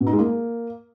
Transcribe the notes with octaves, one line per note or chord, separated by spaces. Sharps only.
B2
D#4
G#3
A#3